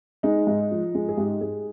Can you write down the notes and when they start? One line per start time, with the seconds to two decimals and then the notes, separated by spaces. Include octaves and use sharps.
0.23 G#3 D#4
0.47 G#2
0.71 F3
0.95 G#3
1.09 G#4
1.18 G#2 G4
1.41 G#2 G#4